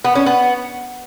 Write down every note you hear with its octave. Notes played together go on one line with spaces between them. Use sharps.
B3
C#4
B3